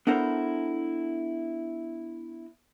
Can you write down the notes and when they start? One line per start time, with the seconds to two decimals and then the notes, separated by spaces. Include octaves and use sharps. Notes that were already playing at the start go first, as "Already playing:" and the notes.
0.07 B3 D4 E4 A4 A#4 C5